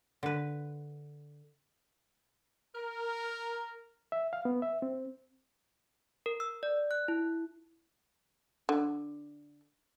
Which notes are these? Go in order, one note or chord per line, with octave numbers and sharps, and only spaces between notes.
D3 B4
A#4
E5
F5
B3
E5
C4
A#4
E6
D5
F#6
E4
D3